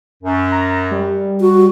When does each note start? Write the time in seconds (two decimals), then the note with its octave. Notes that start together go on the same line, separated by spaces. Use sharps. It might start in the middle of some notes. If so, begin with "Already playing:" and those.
0.23 F#2
0.52 A#5
0.91 G3
1.41 F#4